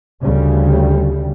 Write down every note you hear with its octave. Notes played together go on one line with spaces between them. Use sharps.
D2 C#3 G3